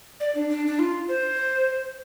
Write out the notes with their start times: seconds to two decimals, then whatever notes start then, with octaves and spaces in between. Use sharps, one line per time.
0.20 D5
0.35 D4
0.50 D4
0.67 D4
0.79 F4
1.08 C5